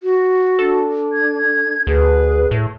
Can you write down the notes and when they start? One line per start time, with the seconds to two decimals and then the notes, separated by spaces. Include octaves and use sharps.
0.03 F#4
0.59 D4 A4
1.13 G#6
1.87 D2 G#4 B4
2.51 A2